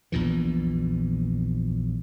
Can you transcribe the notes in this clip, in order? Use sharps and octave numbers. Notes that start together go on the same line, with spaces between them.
A#1 E2 A#2 E3